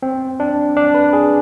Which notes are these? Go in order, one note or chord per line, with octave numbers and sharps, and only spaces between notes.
C4
D4
D4
B4
G#4